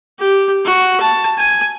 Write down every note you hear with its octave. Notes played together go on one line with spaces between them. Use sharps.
G4
F#4
A5
G#5